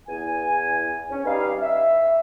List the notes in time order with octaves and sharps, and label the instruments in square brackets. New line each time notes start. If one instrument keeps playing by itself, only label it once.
[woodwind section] E2 G#5
C#4
G3 D#4 B4 D5 F5
E5